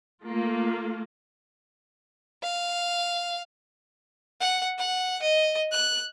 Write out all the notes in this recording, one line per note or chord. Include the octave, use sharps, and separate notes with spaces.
A3 A#3 F4
F5
F#5
F#5
D#5
F#6